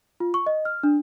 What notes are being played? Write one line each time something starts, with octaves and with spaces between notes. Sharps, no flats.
F4
C#6
D#5
F6
D4